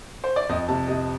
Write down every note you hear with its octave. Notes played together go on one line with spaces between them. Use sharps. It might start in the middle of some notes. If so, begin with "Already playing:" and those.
C5
D5
F2 D#5
C3 A5
C3 D#5